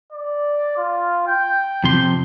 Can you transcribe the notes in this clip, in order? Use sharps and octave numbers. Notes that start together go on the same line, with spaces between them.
D5
F4
G5
F2 C3 C6